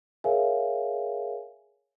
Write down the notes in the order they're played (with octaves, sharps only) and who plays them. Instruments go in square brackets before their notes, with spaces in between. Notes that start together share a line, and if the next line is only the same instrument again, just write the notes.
[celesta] G#4 A#4 C#5 E5 F5 G#5